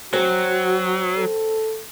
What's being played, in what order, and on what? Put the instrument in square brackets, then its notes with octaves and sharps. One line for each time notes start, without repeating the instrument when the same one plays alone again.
[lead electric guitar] F#3 [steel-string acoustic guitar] C4 [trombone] F#4
[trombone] A4